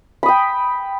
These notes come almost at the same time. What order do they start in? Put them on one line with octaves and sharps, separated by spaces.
B5 D#6 G5